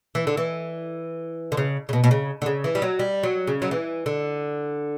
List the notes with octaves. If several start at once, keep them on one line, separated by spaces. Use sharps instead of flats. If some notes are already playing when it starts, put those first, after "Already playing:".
E3
D3
E3
D3
C#3
C#3
B2
B2
C#3
D3
C#3
E3
G3
F#3
G3
F#3
C#3
F#3
E3
D3